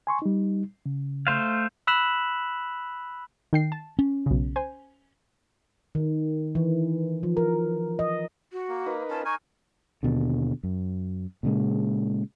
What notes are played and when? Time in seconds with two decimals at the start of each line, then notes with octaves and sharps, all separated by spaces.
0.07 G#5 C6 C#6
0.22 G3 D#4
0.86 C#3
1.27 A3 C5 F5
1.87 B5 E6 F#6 B6 E7 F#7
3.53 D#3 G5 C7
3.72 A5
3.99 C#4
4.26 B1 C#3
4.56 C5 G#5
5.95 D#3
6.55 E3
7.23 F3
7.37 A#4
7.99 D#5
8.52 F#4
8.69 A#3
8.86 D#4 A#4 B4
9.10 C#4 F4 A5
9.25 D#4 A#4 G#5 C#6
10.03 D#2 B2 D3
10.63 F#2
11.43 A#2 C#3 G#3